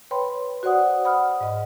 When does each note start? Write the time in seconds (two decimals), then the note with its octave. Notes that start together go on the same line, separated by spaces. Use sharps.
0.11 B4 C#5 G5 B5 C6
0.63 F#4 C5 D5 F#5 D#6
1.05 F#5 B5 D#6 F6
1.41 G#2 D#5